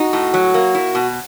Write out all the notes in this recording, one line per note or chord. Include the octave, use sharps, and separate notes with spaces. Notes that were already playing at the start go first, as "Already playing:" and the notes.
Already playing: D#4 F#4
A2
F#3
A#3
E4
B2